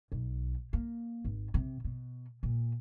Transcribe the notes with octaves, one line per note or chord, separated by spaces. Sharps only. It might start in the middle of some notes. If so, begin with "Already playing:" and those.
B1
A#3
G#1
C3
B2
A#2